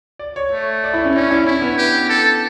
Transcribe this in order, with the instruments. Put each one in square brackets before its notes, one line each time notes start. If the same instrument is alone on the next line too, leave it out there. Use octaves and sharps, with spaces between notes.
[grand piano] D5
C#5
[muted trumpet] A3
[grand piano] D5
E4
C#4
[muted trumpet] C#4 [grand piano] D4
[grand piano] E4
[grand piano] C#4 [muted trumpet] E4
[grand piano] B3
[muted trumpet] G4
A4